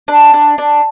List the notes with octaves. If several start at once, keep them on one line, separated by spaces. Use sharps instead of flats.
D4
D4
D4